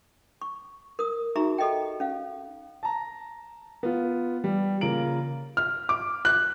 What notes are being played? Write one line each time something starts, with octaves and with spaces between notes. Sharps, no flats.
C#6
A#4 D#6
D#4 F#4 G#4 E5 A#5 C#6
G4 A4 D#5 E5 G5
C#4 F5
A5 A#5
B3 F4
G3
C#3 A#3 F4 A#4 D7 F#7
F6
D6
F#6